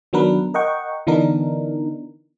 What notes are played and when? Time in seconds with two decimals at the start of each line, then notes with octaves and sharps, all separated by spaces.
0.13 D#3 F#3 B3 D4 A#4 B4
0.54 A#4 D#5 F#5 G5 C#6
1.07 D3 E3 B3 D4 D#4 A#4